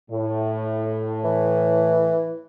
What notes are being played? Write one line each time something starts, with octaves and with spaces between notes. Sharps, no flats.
A2
E3